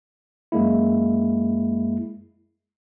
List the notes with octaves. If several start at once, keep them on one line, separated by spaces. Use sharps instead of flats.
F#2 G#3 A#3 E4